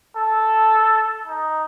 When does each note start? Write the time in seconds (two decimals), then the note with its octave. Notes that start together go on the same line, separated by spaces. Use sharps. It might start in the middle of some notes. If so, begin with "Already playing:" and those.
0.16 A4
1.27 D#4